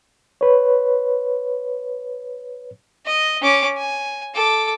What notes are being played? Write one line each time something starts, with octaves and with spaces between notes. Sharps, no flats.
B4 C#5
D#5
C#4 D6
G#5
A4 D6